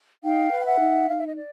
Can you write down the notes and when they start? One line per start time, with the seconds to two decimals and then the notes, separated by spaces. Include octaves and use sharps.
0.23 D#4 F5 G5
0.51 B4
0.61 G5
0.66 E5 F#5
0.80 D#4
1.09 D#4 F5
1.18 E5
1.27 D#5
1.37 D5